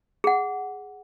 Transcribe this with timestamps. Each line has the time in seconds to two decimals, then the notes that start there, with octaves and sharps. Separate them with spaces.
0.24 G#4 F#5